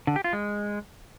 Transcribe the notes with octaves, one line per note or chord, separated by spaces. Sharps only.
D3
G4
F4
G#3